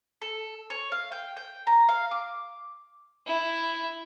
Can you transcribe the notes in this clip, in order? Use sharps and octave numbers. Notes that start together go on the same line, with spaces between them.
A4
C#5
F5
G5
G5
A#5
F5
D6
E4